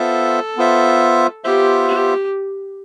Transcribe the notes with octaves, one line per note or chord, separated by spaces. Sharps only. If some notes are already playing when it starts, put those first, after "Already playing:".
Already playing: B3 F4 A4 C5 E5
B3 F4 C5 E5
B3 F4 G4 C5 E5
G4